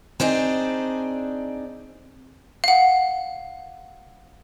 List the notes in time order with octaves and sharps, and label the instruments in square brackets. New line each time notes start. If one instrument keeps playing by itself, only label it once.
[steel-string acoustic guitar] C4 D4 D#4 G#4
[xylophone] F5 F#5